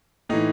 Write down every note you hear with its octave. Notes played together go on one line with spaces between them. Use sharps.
A2 E3 D#4